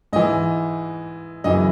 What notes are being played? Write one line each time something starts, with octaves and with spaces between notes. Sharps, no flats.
G#2 E3 D#5
F#2 C#3 E3 D#5